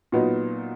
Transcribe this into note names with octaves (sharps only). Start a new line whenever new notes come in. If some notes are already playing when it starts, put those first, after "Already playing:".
A#2 F#3 B3 D#4